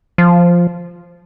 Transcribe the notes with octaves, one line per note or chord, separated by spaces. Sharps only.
F3